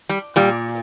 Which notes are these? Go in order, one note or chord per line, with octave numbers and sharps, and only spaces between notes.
G3
A#2 G3